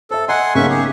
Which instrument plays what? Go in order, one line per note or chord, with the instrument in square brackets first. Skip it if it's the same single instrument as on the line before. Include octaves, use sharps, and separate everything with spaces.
[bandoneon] A4 [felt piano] C5 E5
[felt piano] D#5 A#5 [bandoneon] F#5 G#5 C6
[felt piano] B1 C#3 A#3 [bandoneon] C#4 E5 C#6
[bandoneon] G4 G#4